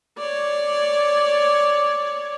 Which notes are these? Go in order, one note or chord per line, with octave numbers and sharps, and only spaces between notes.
C#5 D5